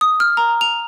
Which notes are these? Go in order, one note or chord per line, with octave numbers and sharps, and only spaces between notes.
D#6
F6
A#5
F7